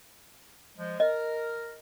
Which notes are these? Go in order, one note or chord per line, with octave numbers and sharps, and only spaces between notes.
F3 G#3
A#4 D#5